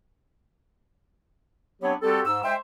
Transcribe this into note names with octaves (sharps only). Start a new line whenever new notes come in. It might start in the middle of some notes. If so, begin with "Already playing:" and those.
F#3 B3 C4 D4 G4 C#5
G3 C4 F#4 G4 A4
G#2 E6
G#3 C5 E5 G5